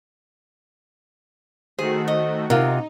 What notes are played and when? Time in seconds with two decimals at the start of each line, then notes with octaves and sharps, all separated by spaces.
1.79 D#3 A3 F#4 G#4 C5
2.08 D#5
2.50 C3 D#4 F4 F#4 A#4